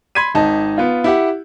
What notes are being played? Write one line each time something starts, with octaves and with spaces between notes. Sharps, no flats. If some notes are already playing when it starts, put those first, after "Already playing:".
B5 C6 G#6 B6 D#7
G#1 D#4 A5
B3 F4
E4 G4 F#5